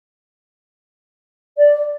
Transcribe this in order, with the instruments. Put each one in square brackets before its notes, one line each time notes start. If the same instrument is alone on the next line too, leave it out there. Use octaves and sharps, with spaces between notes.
[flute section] D5